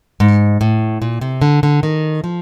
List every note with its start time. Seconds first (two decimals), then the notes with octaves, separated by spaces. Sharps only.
0.20 G#2
0.61 A2
1.02 A#2
1.21 C3
1.42 D3
1.63 D3
1.83 D#3
2.24 F3